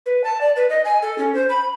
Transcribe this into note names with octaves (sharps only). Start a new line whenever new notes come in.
B4
A5
D5
B4
D#5
G#5
A4
C#4
C5
B5